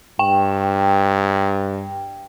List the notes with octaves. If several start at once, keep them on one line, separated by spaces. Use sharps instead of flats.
G2 G5